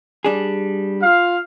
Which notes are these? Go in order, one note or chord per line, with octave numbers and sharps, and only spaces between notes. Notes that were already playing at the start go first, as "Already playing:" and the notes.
G3 D4 G#4
F4 F5